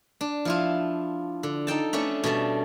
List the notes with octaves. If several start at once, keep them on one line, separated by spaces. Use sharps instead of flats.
D4
F3 E4 F4
D3
D#4 A4 G5 A5
A3 B3 C#4 D4
B2 G3 A3 A5